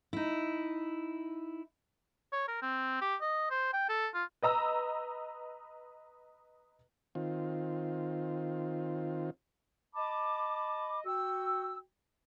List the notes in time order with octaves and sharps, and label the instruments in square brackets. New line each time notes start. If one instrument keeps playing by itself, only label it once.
[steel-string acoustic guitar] D#4 E4
[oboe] C#5
A#4
C4
G4
D#5
C5
G5
A4
F4
[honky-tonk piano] B4 D#5 A#5 E6
[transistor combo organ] D#3 C4 F4
[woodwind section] D#5 A5 B5 D6
F#4 G5 E6